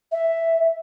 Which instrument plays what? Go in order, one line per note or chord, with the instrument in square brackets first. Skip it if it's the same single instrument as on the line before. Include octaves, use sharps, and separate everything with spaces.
[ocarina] E5